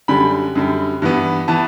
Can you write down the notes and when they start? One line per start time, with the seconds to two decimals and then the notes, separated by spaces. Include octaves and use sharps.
0.08 F#2 D3 G3 B5
0.55 F#2 D3 G3
1.02 G2 E3 B3
1.48 E3 B3 A5